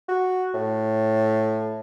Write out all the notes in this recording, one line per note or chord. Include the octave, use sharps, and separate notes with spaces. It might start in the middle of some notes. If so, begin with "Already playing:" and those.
F#4
A2